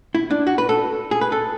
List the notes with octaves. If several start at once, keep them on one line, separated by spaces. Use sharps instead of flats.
E4
D4
F#4
B4
A4
G#4
B4
A4